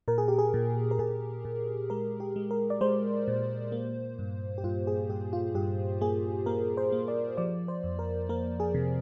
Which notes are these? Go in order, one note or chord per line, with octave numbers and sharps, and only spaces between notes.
A#2 A#4
G#4
G4
G#4
A#2
A#4
A#2 G#4
A#2
G#3 A#4
G4
G#3
A#4
D5
G#3 C5
A#2
A#3
G2
G4
G2 F4
G#4
G2 G4
F4
G2 G4
A#3 G#4
A#3 A#4
C5
A#3
D5
F3 D5
C5
F2
A#4
A#3 A#4
G#4
C3